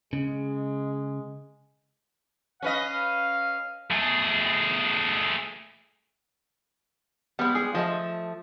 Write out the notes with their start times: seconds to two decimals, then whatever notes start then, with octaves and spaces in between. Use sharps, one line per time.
0.13 C#3 G#3
2.62 C#4 B4 D#5 F5
3.91 A3 G#4
7.39 G3 G#3 B3
7.55 G#4
7.75 F3 A3 D#5